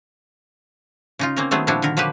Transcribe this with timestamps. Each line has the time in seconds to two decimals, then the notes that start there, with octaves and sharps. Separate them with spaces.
1.19 C#3 D#4 F4
1.36 A#3 C4 C#4 A#4
1.51 D#3 F#3 A3 B3 C4 G#4
1.67 A#2 F3 G3 D4 E4 F#4
1.82 D3 D#3 A#4
1.97 F3 F#3 A#3 G4 B4